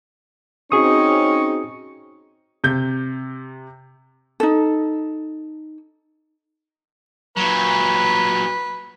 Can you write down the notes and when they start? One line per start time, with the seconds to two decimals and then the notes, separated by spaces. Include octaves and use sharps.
0.72 C4 C#4 D#4 F#4 G#4 C#6 D#6
2.64 C3 G6
4.40 D#4 A4
7.36 A#2 F#3 B4